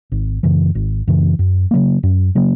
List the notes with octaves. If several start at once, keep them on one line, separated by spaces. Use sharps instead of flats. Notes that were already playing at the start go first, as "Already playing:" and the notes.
G#1
F#2 C#3 E3
G#1
F#2 C#3 E3
F#2
C#3 F#3 A#3
F#2
C#3 F#3 A#3